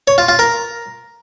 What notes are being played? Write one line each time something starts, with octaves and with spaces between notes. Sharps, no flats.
C#5
F4
F4
A#4